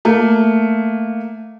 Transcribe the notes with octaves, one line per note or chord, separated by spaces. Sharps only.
A3 A#3